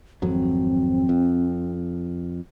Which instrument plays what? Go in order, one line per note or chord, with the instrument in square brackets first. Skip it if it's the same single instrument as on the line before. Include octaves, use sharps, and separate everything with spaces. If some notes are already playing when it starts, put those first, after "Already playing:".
[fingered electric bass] G#1 F2 F#3 [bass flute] C4
[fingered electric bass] F2